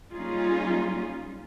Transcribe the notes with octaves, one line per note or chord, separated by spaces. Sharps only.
G3 A#3 C#4 D#4 F4 G#4